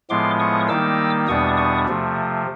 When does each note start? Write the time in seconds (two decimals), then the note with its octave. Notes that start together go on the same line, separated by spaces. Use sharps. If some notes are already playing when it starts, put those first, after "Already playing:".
0.10 A2 F3 G#3 B3 C6 D6
0.39 C#6 D#6
0.69 D#3 G3 A#3 D#4 D6 E6
1.28 E2 B2 G3 B3 D4 C#6 D#6
1.57 C#6 D#6
1.88 C3 F3 A3